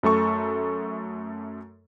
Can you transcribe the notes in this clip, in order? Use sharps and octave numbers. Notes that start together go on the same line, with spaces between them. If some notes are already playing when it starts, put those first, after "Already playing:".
F#2 A3 A4 C#6